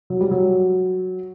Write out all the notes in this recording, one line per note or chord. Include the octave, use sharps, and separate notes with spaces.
F#3
G3
F#3